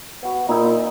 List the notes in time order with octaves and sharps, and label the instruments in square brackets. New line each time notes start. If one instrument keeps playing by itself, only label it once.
[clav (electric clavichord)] B3 F#4
[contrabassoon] A#2 [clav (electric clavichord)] D#4 E4